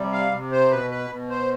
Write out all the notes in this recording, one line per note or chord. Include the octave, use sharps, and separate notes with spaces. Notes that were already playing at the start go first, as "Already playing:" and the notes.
Already playing: C3 G3
F5
C3
C5
B2 B4
B4
B2
C5